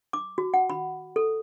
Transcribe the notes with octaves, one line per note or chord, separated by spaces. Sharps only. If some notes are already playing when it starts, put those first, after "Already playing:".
D6
F#4
F#5
B5
A4